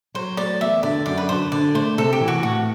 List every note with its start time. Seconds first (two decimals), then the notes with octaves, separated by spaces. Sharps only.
0.14 F#3 C5
0.37 A3 D5
0.61 E2 E5
0.83 D3 D5
1.06 F#2 D5
1.18 B4
1.29 D3 C5
1.52 D3 D5
1.74 A3 C5
1.97 C3 A4
2.13 G4
2.21 E3
2.28 F#4
2.43 A2 F#4